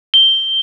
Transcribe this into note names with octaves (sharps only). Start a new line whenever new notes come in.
G7